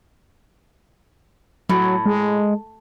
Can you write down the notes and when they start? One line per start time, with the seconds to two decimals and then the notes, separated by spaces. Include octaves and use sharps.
1.69 A2 F#3
2.06 G#3